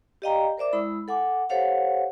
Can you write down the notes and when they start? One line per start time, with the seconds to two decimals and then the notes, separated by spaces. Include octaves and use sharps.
0.22 G4 D5 D#5 F5 G5 A#5
0.57 A#4 C5 D5 E5 D6
0.72 G#3 E4 B5 D#6 E6
1.08 A4 F#5 G#5 D6
1.49 G4 A4 C5 C#5 F5 F#5